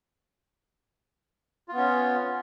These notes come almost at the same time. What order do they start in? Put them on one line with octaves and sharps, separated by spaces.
F4 B3 C#4